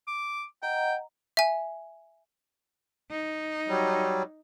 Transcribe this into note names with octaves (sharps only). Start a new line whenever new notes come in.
D6
D#5 F#5 G5 A#5
E5 G#5
D#4
F#3 G3